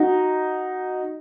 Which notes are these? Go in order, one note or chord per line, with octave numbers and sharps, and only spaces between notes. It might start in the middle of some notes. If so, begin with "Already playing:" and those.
Already playing: D#4 F#4